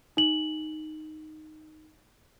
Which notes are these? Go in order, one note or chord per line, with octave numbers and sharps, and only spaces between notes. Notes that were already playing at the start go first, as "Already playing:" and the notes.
D#4 F#7